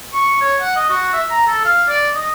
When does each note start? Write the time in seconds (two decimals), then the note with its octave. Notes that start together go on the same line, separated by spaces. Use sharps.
0.13 C#6
0.41 C#5
0.60 F#5
0.76 D#5
0.90 F#4
1.13 E5
1.31 A#5
1.47 A4
1.65 F5
1.88 D5
2.15 D#5